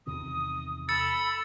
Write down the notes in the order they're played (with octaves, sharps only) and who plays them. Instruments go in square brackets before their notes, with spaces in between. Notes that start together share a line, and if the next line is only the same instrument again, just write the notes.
[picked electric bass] E2 C3 D#3 [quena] D#6
[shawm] A4 [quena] B5 [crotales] E6 A6 C#7